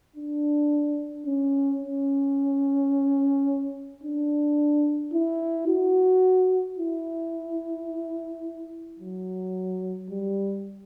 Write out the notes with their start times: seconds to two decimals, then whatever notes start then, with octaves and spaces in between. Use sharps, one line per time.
0.16 D4
1.27 C#4
1.82 C#4
4.03 D4
5.13 E4
5.68 F#4
6.78 E4
8.99 F#3
10.10 G3